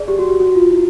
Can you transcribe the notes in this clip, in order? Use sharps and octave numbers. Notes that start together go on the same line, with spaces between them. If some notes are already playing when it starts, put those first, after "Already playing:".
Already playing: G#4 D5
G4
F#4
G4
F#4
F4
E4